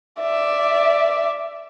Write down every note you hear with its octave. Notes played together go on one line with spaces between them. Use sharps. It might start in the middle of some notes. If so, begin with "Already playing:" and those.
D5 E5